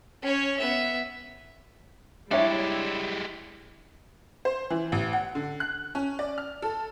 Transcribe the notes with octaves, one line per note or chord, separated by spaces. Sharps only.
C#4 C#5
B3 E5
G3 G#3 D4 E4 G4 C#5 E5
C5
E3
A1
F#5
D3
F#6
C#4
D5
F6
A4